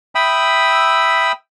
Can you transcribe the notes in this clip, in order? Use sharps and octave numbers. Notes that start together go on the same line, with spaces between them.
E5 G5 B5 D#6 E6